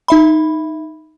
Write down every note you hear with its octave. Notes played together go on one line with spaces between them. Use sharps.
D#4 E5 B5